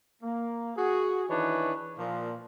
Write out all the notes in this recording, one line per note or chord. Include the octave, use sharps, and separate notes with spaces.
A#3
F#4 G#4
D#3 E3 D4 D#4 B4 C#5
A#2 F3